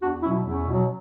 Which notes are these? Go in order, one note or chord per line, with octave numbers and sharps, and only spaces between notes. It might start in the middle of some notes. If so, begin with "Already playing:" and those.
E2 D4 F#4
B2 F#3 C#4 E4
E2 C#4 E4
B2
F#3